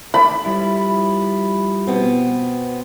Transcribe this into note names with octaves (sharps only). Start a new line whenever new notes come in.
D#3 A3 D4 B5
F3 G3 E4
B2 B3 C4